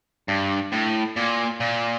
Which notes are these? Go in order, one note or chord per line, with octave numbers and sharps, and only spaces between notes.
G2
A2
A#2
A#2